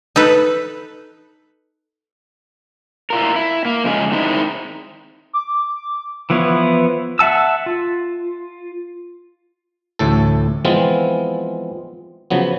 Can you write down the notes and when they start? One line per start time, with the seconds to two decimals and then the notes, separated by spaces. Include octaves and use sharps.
0.16 D#4 A4 B4
3.10 E4 F4 A#4
3.36 E4
3.65 A#3
3.84 F2 C#3 G#3 D#5 G#5
4.12 D#3 G#3 C4 D#4 E4
5.33 D6
6.30 E3 F3 B3 E4 C#5
7.19 E5 F#5 A5 E6
7.66 F4
9.99 A1 D2 A2 A4
10.65 E3 F3 G#3 B3 C4 F4
12.30 C#3 F3 F#3 B3